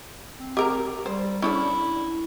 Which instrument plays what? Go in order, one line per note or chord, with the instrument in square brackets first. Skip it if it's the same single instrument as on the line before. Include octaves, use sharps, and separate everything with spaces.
[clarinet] C4
[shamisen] G4 A#4 A#5
[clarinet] G3 [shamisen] C5
[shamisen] C#4 D4 A4 [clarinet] E4